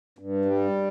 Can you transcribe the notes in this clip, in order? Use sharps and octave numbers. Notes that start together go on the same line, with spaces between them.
G2
G3